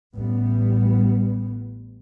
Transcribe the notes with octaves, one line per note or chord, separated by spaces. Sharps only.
A1 G3 B3